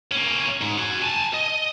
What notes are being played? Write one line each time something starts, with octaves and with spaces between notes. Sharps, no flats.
A#3 C#4
G#2
F#4 G#5
G#5 A5
D#5